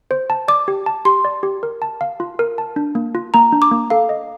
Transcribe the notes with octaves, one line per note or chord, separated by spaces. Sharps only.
C5
A5
D5 D6
G4
A5
G4 C6
D5
G4
A#4
A5
F5
F4
A#4
A5
D4
A#3
F4
A#3 A#5
D4
D6
A#3
A4 F5
D#5